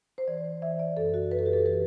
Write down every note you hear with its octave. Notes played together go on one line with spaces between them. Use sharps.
C5
E3 D5
E3 E5
D5
F#2 A4
F#4
F#2 B4
A4
G4
A4
E3 B4